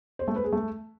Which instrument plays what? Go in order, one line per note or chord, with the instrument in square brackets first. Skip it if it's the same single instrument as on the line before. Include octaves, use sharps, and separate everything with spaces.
[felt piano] C5
A3
B4
G#4
A3